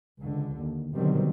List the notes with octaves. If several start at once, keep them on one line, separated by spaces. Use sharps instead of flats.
C#2 D3
D#2
B2 D3 D#3 F#3 G3 C4